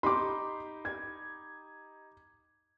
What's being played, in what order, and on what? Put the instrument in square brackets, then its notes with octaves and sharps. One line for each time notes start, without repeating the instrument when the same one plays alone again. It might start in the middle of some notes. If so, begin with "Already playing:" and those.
[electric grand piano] D#4 G4 B5 [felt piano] C6 D6
[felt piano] G#6